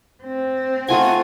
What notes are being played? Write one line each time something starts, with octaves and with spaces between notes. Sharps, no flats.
C4
A3 F4 F#5 G#5